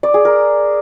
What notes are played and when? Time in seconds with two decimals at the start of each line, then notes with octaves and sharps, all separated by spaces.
0.03 D5
0.14 G#4
0.25 A#4